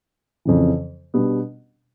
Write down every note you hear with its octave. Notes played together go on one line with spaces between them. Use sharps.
F2 C#3 E3
B2 G3 B3 D4